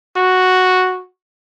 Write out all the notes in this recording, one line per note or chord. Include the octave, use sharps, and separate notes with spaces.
F#4